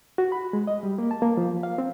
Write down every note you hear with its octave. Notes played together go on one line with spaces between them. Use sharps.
F#4
B5
G#3
D#5
G3
A#3
A5
A#3
F3
F5
C4